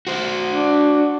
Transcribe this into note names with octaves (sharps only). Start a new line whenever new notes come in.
F#4 C5
D4